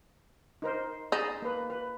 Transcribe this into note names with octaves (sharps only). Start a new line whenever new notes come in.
D#4 A#4 C5
D#4 G#4 A5 B5
A#3 B4
B4